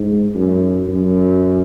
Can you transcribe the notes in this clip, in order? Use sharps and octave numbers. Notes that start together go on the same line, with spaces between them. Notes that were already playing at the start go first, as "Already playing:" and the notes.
Already playing: G#2
F#2
F#2